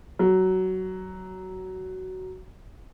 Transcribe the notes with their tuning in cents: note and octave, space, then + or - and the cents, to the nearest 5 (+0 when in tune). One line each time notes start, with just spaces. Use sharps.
F#3 +15